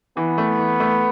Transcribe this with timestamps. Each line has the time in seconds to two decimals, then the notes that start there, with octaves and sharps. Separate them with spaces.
0.17 E3 B3
0.38 A3
0.59 E3
0.80 A3